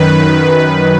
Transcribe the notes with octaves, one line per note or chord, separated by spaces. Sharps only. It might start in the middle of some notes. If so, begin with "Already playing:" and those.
Already playing: F#2 D#3 B4